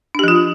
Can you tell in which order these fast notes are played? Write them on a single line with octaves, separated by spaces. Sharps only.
D4 G4 F3 F4